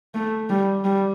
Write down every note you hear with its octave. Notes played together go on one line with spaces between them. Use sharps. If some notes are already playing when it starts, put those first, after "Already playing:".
A3
G3
G3